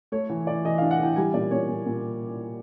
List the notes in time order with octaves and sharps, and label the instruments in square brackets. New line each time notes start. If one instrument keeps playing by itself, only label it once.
[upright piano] A3 C#5
E3
E3 D5
E3 D#5
D4 F5
F#5
E3 G5
G3 G#5
A#2 D5
A#2 C#5
A#2
A#2